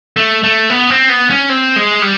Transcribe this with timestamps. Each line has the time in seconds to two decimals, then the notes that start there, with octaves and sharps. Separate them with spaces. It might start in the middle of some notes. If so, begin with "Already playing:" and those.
0.17 A3
0.44 A3
0.70 B3
0.90 C4
1.09 B3
1.30 C#4
1.49 C4
1.76 G#3
2.02 G3